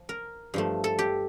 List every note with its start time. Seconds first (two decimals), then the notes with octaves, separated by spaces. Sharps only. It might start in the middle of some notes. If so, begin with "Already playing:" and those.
Already playing: F3
0.09 A#4
0.54 G2 F3 A3
0.84 A4
0.99 G4